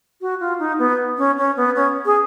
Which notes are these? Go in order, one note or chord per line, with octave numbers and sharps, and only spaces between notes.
F#4
F4
D#4
B3
C#4
C#4
B3
C#4
G#4